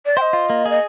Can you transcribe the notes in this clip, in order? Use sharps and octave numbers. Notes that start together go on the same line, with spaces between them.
D5
C5 D#5 G5
F4
A#3
G#4 D#5